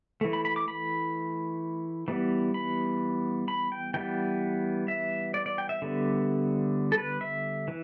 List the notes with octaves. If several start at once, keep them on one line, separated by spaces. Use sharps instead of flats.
E3 A3
B5
B5
D6
B5
E3 G3 B3
B5
B5
G5
E3 G3 B3 G5
E5
D5
D5
G5
E5
D3 G3 B3
A4
B4
E5
E3